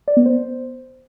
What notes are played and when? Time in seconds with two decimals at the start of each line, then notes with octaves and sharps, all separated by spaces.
0.08 D5
0.17 B3
0.26 C5